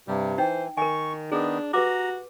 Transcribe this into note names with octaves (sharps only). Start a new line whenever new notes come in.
G2 C3 G3
E3 D#4 C5 G5
D#3 A#4 G#5 C#6
D#3 B3 D4 D#4 G#4
F#4 G4 B4 A#5 D6